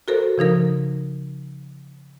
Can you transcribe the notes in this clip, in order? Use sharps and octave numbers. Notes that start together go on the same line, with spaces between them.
F#4 A4 A#4 C5
C#3 F3 D#4 A#4